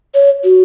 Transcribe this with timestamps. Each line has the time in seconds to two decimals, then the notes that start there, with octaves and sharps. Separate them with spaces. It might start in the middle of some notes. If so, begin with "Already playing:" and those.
0.14 C#5
0.44 F#4